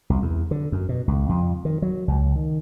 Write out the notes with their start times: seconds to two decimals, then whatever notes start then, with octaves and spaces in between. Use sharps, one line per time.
0.10 C2
0.22 E2
0.51 D3
0.72 F#2
0.89 B2
1.08 C#2
1.29 F2
1.65 D#3
1.82 F#3
2.08 C#2
2.36 D#3